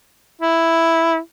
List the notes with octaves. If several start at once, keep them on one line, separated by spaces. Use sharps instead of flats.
E4